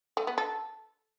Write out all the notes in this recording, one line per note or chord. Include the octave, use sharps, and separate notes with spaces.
A3
B3
A4